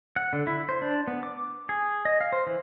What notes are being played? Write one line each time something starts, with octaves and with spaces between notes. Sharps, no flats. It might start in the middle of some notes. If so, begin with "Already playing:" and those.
F#5
D3
E4
C5
D4
B3
D6
G#4
D#5
F5
C5
E3